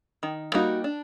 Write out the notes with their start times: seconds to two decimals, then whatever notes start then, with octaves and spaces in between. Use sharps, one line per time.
0.23 D#3
0.54 G3 A#3 D#4 F#4
0.84 D4